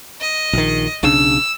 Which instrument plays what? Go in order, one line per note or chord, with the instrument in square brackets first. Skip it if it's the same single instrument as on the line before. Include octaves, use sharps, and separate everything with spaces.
[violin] D#5
[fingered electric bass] A#1 D#3
[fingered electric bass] B1 C#3 D4 [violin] E6